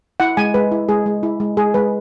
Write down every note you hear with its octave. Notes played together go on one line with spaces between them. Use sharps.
E4 F#5
G#3 G#5
G#3 B4
E4
G#3 G#4
G#3
E4
G#3
G#3 G#4
G#3 B4